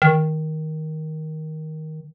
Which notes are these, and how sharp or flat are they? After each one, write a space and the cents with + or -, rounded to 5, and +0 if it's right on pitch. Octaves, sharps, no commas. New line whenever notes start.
D#3 +10